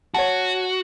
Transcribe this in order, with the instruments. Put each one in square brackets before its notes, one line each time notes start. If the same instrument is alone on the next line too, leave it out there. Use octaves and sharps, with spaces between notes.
[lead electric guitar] F#4 [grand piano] C#5 F#5 A5